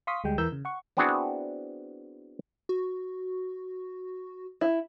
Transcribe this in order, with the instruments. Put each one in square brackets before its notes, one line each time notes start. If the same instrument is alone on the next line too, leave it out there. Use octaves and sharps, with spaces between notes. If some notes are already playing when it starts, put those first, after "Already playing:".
[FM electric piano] F5 C6 C#6 D#6 B6
D2 G3 G#3 G5
E2 E3 A#4 E6 G6
C#3
F#5 C#6
[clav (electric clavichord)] B3 C4 D4 E4 F#4 G#4
[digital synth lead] F#4
[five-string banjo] E4